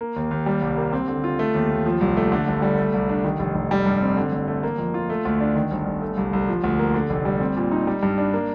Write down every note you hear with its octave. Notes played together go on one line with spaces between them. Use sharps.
A#3
D#2
D#2
G3
C2
A#3
C4
D3
F4
A3
D#2
D#2
F3
C2
A3
D3
G1
G3
A3
C2
D4
D#3
F1
F1
G3
G2
C4
D3
A1
A3
A#3
F2
F4
A3
D2
D4
D#3
G1
G1
A3
C2
C2
F3
D2
A#3
D3
F1
G3
C4
A#2
D#4
G3
G2
D4
A#3